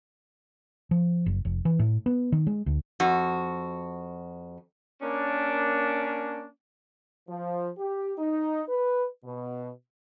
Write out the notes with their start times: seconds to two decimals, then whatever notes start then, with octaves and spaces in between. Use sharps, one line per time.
0.91 F3
1.26 F#1
1.45 F1
1.65 E3
1.79 A2
2.06 B3
2.32 D#3
2.47 G#3
2.66 D2
3.00 F2 F#4
5.02 A#3 C#4 D4
7.29 F3
7.78 G4
8.18 D#4
8.69 B4
9.25 B2